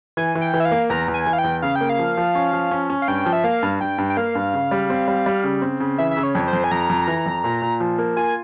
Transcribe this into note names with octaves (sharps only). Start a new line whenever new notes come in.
E3 G#5
E3
G5
E3
E5
F5
A#3
E2 A#5
E2
G#5
E3
F5
G5
E2
C#3 F5
G5
A#3
F5
F3
F3
C#4
F3
C#4
C#4
F5
G2 G5
F3
E5
A#3 F5
G2
G2 G5
G2
G5
A#3 F5
G2
C#3
G3
C4
G3
G3
C#3
C4
C#3
E3 E5
E5
C#3
C#5
F2
C5
F2
G#5
F2 A#5
F2
E3
F2
A#2
A#2
F3
A#3
F4 G#5